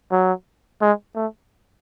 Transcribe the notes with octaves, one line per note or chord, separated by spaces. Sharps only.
F#3
G#3
A3